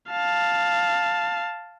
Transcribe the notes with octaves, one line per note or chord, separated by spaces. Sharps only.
F5 A5